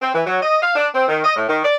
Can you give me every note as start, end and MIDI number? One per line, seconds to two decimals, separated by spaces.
0.02 0.11 60
0.14 0.22 52
0.27 0.38 54
0.42 0.60 75
0.62 0.72 77
0.76 0.87 62
0.94 1.08 60
1.08 1.21 51
1.24 1.36 75
1.36 1.48 45
1.49 1.61 51
1.64 1.75 74